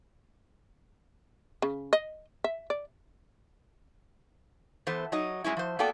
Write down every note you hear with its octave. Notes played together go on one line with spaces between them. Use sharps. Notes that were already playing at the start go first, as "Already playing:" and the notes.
C#3
D#5
E5
D5
E3 B3 A4 C5
F#3 D#4 D#5
G3 G#3 C#4 E4
F3 C5
A#3 B3 F#4 A4 D5 G5